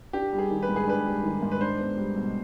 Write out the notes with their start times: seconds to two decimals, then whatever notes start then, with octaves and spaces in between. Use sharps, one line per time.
0.13 D4 G4
0.33 G3
0.38 G#4
0.51 D#3
0.63 B4
0.69 G#2
0.76 G#4
0.87 D4 B4
1.06 G3
1.24 D#3
1.42 G#2
1.52 B4
1.61 D4 C5
1.79 B3
1.97 G3
2.16 B2